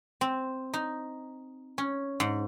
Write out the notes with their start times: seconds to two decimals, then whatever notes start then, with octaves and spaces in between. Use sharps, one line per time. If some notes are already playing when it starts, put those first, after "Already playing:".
0.21 C4
0.74 D#4
1.78 C#4
2.20 G#2